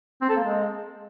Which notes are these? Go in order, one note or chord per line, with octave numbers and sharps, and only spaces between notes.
C4
A4
A#3
G#3